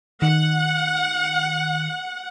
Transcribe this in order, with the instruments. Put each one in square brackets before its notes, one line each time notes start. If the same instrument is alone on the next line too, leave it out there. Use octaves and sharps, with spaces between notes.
[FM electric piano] D#3 [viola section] F#5